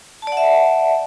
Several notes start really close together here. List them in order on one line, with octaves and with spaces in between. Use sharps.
A5 D5 F#5 E5